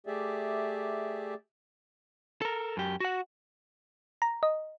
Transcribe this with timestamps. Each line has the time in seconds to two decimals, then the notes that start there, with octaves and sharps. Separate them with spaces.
0.07 A3 G4 G#4 D5 E5
2.42 A4 A#4
2.77 F#2 G4
3.00 F#4 F#5
4.22 A#5
4.43 D#5